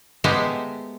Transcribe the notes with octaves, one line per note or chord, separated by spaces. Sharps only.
G#3 A3 B3 G4 C5